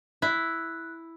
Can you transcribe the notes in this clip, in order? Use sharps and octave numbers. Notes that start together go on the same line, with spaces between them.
E4 F#6